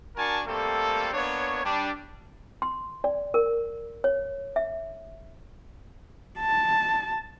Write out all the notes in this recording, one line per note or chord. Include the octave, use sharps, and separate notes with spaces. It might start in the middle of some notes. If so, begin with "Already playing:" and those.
D4 F#4 A#4 G#5 A5 C#6
G3 A3 A#3 C4 A4
A#3 B3 D4 C#5
G3 D4
C6
D5
A#4
C#5
E5
A5